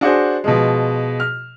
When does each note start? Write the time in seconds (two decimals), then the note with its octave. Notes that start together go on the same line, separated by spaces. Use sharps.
0.01 D4 F#4 G#4 C5
0.44 B2 F3 G#3
1.20 F6